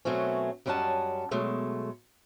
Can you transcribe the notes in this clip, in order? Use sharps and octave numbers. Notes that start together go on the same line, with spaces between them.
B2 F#3 A3 C4 C#4
F#2 G3 C#4 D#5 F#5 A5
B2 F#3 G#3 A3